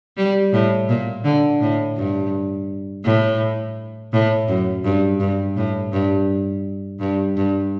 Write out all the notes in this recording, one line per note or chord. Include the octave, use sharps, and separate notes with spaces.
G3
A2
A#2
D3
A2
G2
A2
A2
F#2
G2
G2
A2
G2
G2
G2